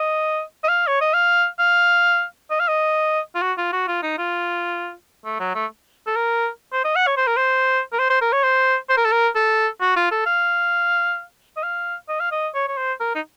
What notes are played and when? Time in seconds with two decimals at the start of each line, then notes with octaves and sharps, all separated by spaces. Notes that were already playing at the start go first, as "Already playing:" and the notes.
Already playing: D#5
0.64 D#5
0.69 F5
0.87 C#5
1.01 D#5
1.14 F5
1.59 F5
2.51 D#5
2.60 F5
2.68 D#5
3.35 F4
3.42 F#4
3.58 F4
3.73 F#4
3.88 F4
4.03 D#4
4.18 F4
5.25 A3
5.40 F#3
5.55 A3
6.07 A4
6.16 A#4
6.73 C5
6.84 D#5
6.96 F#5
7.07 C#5
7.17 C5
7.27 A#4
7.37 C5
7.93 A#4
7.99 C5
8.10 C5
8.21 A#4
8.33 C#5
8.44 C5
8.89 C5
8.97 A#4
9.05 A4
9.12 A#4
9.35 A4
9.81 F#4
9.96 F4
10.11 A4
10.26 F5
11.57 D#5
11.63 F5
12.09 D#5
12.20 F5
12.32 D#5
12.55 C#5
12.68 C#5
12.77 C5
13.00 A#4
13.15 D#4